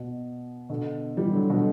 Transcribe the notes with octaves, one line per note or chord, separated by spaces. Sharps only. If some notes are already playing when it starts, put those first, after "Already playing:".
Already playing: B2
B2 D3
E3 G3
D3 F#3
B2 D3